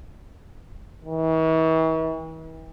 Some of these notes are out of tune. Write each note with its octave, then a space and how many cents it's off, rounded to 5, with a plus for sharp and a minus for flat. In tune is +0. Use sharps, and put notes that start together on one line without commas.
E3 -45